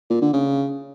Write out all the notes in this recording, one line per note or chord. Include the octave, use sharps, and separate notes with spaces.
A#2
D3
C#3